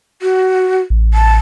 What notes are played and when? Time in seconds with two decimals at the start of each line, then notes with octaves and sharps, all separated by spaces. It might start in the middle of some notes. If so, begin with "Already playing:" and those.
0.22 F#4
0.90 A1
1.14 A5